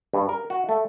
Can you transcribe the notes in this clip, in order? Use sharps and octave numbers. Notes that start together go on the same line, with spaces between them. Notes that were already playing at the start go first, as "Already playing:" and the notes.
G2
A#4
F#4
A3